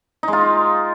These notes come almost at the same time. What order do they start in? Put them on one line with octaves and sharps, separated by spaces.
D#4 G#3 F4